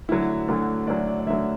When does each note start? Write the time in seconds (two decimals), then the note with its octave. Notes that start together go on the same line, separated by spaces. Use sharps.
0.08 D2 D3 F#3 E4
0.48 D2 D3 F#3
0.87 D2 D3 F#3 D5
1.07 D5
1.19 D5
1.26 D2 D3 F#3 E5